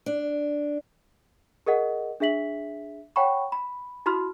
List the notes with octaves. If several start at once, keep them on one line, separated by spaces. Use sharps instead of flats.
D4
G#4 A#4 D#5 F#5
D4 G#4 E5 B6 F#7
C#5 F#5 G5 A5 B5 C#6
B5
E4 F#4 B5 C6 F6